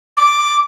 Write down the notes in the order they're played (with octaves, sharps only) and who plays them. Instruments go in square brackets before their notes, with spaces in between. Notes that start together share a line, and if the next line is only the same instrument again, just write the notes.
[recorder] D6